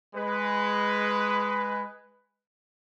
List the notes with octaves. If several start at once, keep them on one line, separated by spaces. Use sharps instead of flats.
G#3 B4